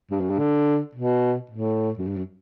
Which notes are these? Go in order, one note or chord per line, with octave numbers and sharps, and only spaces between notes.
G2
F#2
G2
D3
B2
A2
F#2
G2
F#2